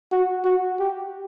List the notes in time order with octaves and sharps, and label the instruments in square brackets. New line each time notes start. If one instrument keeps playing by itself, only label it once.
[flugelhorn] F#4
F#4
G4